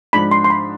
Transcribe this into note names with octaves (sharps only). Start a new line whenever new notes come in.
G#2 F3 G#3 D4 B5
C6
C6
B5